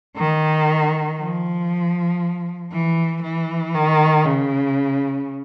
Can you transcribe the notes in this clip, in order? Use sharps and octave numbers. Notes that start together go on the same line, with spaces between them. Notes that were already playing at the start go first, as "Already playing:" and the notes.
D#3
F3
E3
E3
D#3
C#3